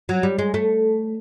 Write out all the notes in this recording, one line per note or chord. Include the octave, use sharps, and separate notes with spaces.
F#3
G3
G#3
A3